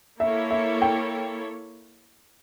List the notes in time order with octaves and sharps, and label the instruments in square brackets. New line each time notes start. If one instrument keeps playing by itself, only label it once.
[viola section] A#3 E4 A4 C#5 [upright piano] E5
[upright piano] E5
G5